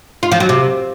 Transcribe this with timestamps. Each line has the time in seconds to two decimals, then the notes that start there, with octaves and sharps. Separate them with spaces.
0.23 F4
0.32 F3
0.40 F#3
0.49 C3